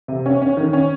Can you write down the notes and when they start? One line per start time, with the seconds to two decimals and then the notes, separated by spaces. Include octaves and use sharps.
0.08 C3
0.26 C#4
0.42 C#4
0.57 D#3
0.73 C#4